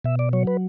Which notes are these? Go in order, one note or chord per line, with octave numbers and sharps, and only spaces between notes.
B2 E5
D5
F#3 C#5
B4